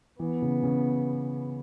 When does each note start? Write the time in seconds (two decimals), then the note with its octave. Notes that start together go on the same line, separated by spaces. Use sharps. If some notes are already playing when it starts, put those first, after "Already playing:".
0.19 E3 B3
0.42 C#3
0.63 C#3